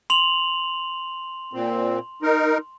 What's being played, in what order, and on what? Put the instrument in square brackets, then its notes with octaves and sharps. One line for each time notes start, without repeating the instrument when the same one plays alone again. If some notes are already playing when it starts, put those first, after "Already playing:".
[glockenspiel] C6 F7 F#7
[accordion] A#2 C4
D#4 A#4